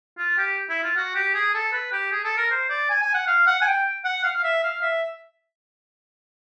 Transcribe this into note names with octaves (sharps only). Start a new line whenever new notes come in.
F4
G4
E4
F4
F#4
G4
G#4
A4
B4
G4
G#4
A4
A#4
C5
D5
G#5
G#5
F#5
F5
F#5
G#5
G5
F#5
F5
F5
E5
F5
E5